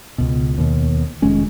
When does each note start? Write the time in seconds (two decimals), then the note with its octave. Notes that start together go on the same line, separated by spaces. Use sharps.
0.18 C#2 B2
0.58 D#2 B2
1.22 F1 D#3 G#3 C#4